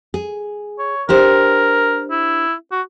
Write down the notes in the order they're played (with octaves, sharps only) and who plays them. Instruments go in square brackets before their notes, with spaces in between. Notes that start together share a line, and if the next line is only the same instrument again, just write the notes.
[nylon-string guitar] G#4
[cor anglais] C#5
[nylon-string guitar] D4 G4 C5 [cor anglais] A#4
[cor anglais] E4
F#4